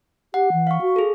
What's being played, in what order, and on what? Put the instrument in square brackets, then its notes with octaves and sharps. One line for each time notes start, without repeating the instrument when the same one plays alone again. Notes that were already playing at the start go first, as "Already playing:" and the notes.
[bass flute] G4 [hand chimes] F#5
[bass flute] E3
[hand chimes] F5 C#6
[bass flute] F#4
[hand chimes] G#4 A4